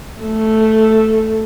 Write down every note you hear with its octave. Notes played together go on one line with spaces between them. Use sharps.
A3